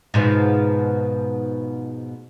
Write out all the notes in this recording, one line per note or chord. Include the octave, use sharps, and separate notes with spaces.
G#2 B2 F3